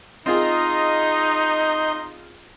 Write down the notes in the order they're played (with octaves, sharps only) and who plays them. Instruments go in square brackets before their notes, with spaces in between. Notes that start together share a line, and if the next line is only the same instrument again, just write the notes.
[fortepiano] C4 F4 G#4 [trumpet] D#4 [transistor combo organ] D#5 C6